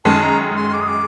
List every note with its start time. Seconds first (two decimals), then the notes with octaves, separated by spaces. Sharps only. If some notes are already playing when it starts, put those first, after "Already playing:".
0.05 F#2 D#3 G#3 A5
0.22 A#5
0.56 C6
0.73 D6
0.81 D#6
0.88 D6